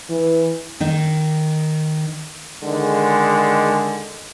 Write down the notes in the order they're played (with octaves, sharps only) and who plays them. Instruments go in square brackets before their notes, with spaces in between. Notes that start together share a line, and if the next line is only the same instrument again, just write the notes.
[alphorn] E3
[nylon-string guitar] D#3 D#4
[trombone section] D3 D#3 G#3